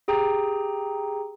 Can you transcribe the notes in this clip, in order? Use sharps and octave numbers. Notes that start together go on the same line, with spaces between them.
G4 G#4 G5 A#5